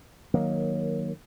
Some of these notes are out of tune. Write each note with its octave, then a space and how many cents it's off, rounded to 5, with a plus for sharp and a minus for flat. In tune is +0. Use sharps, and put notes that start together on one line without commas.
D#3 +0 F#3 -5 A#3 +15